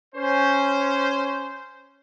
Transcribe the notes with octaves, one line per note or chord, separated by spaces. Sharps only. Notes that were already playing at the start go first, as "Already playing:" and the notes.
C#4 C5